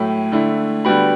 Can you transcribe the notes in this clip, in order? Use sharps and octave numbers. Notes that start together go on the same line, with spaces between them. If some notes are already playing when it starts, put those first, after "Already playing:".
Already playing: A2 F#3 A3 E4 G5
D3 A3 E4
D3 G3 B3 F#4 G5 B5